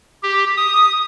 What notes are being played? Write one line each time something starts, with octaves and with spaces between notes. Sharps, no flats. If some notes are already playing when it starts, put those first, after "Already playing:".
G4
D#6